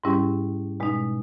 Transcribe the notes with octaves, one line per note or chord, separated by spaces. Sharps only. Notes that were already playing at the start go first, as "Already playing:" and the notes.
G#2 G3 C#4 E4 G4
B2 G#3 D#4